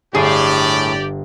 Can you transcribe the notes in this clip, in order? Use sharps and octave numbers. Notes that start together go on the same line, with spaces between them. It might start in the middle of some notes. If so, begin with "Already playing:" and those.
G1 A2 G4 G#4 D5 D#6 C7